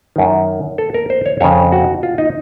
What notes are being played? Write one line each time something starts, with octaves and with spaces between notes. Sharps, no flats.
F#2 D#3
A4
A#4
C5
C#5
F2 C#3 C#5
F#4
F4
D#4